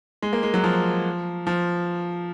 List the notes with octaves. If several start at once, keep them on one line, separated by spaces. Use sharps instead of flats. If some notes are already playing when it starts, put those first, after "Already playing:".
G#3
A#3
G#3
F#3
F3
F3